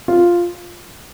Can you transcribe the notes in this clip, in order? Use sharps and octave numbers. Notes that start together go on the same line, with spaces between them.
F4